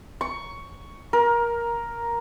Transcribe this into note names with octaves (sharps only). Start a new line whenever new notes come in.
C#6
A#4